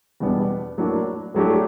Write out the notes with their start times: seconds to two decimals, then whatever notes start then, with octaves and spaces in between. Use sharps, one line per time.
0.20 E2 B2 G3 B3 D4
0.78 A2 F#3 A#3 D4
1.34 A2 F#3 A3 D4 G4